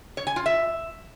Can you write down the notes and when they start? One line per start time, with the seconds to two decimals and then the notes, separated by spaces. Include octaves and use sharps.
0.17 C#5
0.27 G#5
0.36 F4
0.46 E5